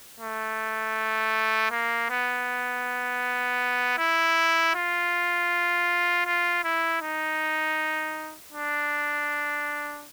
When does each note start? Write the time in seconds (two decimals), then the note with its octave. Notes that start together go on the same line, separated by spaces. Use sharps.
0.20 A3
1.72 A#3
2.10 B3
3.98 E4
4.75 F4
6.26 F4
6.64 E4
7.02 D#4
8.52 D4